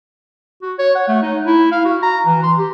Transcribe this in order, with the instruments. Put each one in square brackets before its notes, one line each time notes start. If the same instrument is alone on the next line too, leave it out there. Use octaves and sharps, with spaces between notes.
[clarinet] F#4
C#5
F#5
A3
D#4
E4
F5
F#4
A#5
E3
C6
G4